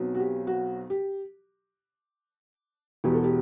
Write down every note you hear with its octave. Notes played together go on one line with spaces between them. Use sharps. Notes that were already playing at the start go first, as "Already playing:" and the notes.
Already playing: B1 B2 F#3 C4
F#4
G4
F#4
G4
E1 E2 B2 G4
A4
G4